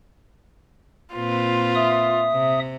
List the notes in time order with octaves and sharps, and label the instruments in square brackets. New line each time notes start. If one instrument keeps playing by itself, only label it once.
[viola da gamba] A#2 C4 B4 [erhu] F4
[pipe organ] E5 D#6
[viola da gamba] C3